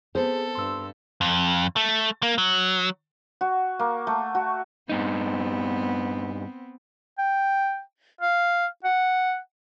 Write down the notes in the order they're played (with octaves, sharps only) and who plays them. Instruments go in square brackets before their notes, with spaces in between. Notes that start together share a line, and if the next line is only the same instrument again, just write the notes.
[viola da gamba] B3 C4 [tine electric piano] G#4 [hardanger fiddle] A4 [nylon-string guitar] C5
[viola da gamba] G2 [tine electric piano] C6 E6
[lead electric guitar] F2
A3
A#3
F#3
[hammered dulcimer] F#4
A#3
A3
F#4
[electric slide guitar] G2 D#4 [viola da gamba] B3 C4
[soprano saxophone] G5
F5
F#5